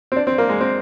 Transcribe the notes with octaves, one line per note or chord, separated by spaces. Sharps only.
C4
D4
C4
A#3
G#3
C4